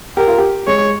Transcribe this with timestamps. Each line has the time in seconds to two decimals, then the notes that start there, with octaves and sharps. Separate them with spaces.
0.17 G4 A#4
0.28 F4
0.38 G4
0.67 G#3 C#5